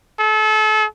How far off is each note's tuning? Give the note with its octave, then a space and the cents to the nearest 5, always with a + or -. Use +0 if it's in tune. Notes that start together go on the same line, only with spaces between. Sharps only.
A4 -35